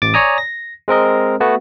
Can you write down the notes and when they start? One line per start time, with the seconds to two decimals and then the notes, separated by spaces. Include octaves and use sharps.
0.02 A1 D6 A6
0.14 C#5 D5 G#5 A#5 D#6
0.38 A#6
0.88 G#3 C4 A#4 D#5
1.40 A3 B3 F#4